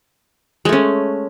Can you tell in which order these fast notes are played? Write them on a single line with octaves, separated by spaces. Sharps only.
G#3 A3 C#4